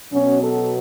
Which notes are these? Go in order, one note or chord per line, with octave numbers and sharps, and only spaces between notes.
B2 F#3 B3 C#4
A4